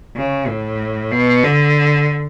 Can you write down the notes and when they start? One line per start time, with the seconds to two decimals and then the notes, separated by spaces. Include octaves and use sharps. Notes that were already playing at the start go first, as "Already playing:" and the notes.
0.16 C#3
0.48 A2
1.11 B2
1.44 D3